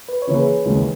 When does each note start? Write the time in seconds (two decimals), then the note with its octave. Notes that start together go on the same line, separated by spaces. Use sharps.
0.09 B4
0.22 C#5
0.27 C#3 E3 A#3 E4
0.35 G#4 B4
0.65 D#2 C#3 E3 G#3